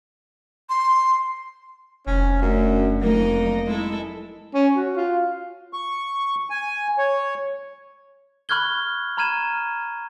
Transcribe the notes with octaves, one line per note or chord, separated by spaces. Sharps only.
C6
F1 C#4
F#2 D3 A3 C#4
F2 F#3 A3 A#3 D#4 D#5
G#3 E4 A4
C#4
F#4
F4
C#6
G#5
C#5
B5 C#6 F6 F#6 G#6 G7
A#5 B5 F6 G#6 D#7 E7